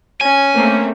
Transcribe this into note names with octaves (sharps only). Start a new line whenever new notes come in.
C#4 G#5
A3 A#3 C4